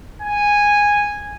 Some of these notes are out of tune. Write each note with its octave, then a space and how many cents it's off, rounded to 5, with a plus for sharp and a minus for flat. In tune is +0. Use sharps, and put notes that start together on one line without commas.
G#5 -10